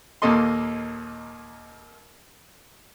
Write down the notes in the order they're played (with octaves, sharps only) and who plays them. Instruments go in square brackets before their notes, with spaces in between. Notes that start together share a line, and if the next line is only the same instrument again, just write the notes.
[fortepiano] D#2 A#2 A#3 A4 D#5 C6